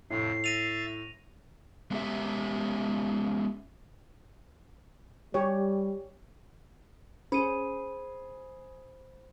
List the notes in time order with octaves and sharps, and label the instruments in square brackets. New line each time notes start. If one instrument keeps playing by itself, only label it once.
[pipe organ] F2 C3 [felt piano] A2 [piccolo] C7
[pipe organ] E5 A6 [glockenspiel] A#6 D#7 F7
[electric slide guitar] G#3 B3 C#4 D4 G4 E5
[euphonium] G3 [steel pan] G4 C#5
[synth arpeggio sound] C#4 [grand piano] G#4 [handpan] C5 [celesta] B5 D#7